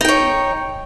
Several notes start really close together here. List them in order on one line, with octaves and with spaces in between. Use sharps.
D#4 G5 C#5